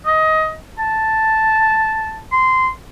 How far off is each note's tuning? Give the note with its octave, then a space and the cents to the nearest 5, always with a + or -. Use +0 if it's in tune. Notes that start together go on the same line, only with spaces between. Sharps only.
D#5 +20
A5 +0
C6 -15